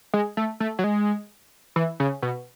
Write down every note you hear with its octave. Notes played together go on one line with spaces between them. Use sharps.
G#3
A3
A3
F#3
G#3
E3
C#3
B2